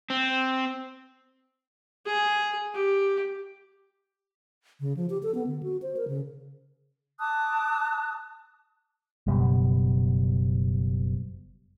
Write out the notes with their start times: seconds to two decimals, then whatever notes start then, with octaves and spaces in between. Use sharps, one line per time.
0.10 C4
2.06 G#4
2.74 G4
4.80 C#3
4.97 F3
5.10 G4
5.23 A4
5.35 B3
5.47 D3
5.63 F#4
5.82 C5
5.97 A#4
6.08 C#3
7.20 A5 D6 D#6 F#6
9.27 F#1 F#2 B2 G3